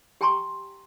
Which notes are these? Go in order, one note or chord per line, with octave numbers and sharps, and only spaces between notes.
G4 G5 G#5 A#5 C6 C#6